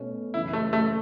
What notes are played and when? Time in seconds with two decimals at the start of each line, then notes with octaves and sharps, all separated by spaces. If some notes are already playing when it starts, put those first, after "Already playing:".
Already playing: B2 A3 C#4
0.34 F#2 C#3 E3 E4
0.53 A3
0.73 A3